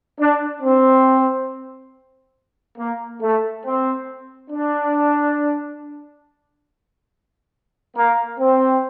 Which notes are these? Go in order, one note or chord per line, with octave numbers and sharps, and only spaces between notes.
D4
C4
A#3
A3
C4
D4
A#3
C4